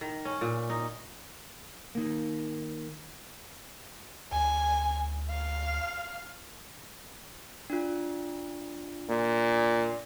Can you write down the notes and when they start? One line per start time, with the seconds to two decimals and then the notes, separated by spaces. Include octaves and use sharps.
0.01 D#3
0.25 C#4
0.41 A#2
0.70 D#4
1.95 D#3 A#3
4.32 D2 G#5
5.30 F5
7.70 D4 F4
9.09 A#2